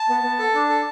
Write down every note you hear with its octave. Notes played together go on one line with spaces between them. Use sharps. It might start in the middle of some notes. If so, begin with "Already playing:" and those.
Already playing: A5
B3
B3
A4
D4
A4